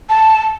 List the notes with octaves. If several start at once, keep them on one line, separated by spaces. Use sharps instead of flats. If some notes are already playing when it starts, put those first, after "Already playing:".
A5